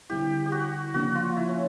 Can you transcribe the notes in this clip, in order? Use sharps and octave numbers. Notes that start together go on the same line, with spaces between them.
D3 G3 C4 E4 G4
G4
F#4
C#3 F3 A#3 D4 F#4
F4
E4
C#4